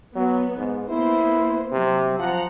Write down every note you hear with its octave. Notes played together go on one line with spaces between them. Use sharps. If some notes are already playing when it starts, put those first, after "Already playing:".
F#3 B3
G#2
A#3 B3 E4 C5
C3 F#3
F3 F#5 A#5